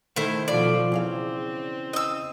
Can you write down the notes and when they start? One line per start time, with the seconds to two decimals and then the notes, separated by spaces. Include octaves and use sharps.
0.16 D#3 A3 E4 A4 C5
0.48 B2 F3 F4 D5
0.92 E2 C#3 C4 F5
1.93 D#5 E6